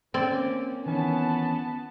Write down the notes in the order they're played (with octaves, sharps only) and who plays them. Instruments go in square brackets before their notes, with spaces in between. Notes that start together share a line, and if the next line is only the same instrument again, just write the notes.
[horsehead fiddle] A#3 C#4 [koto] C4 D5
[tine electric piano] D#3 E3 C#4 [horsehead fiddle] B3 A5